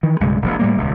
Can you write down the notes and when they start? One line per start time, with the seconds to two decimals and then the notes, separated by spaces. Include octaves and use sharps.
0.03 D#3 E3
0.20 B1 G2 C#3 G#3
0.41 E1 A#1
0.59 A2 G3 A#3
0.77 D#1 C#2